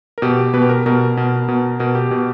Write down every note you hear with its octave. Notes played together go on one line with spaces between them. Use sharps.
A#4
B2 G4
B2 B4
G4
A#4
B2 A#4
B2
B2
B2 A#4
G4
B2